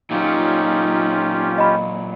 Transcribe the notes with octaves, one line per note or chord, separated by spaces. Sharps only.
A#2 F#3 C#4 D#4 F4 G4
D#5 B5